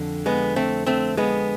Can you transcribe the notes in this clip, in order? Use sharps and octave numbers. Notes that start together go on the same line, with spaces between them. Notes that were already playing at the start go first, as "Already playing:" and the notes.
Already playing: F2 D3
G#3 B3
A3 C4
A3 C4
G#3 B3